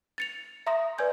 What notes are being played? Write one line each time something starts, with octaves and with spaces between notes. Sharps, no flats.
A6 C#7 F7
E5 A#5 C6 D#6 A#6
B4 D5 G#5 G6 G#6